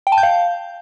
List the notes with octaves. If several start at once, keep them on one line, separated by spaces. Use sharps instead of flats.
G5
A5
G6
F5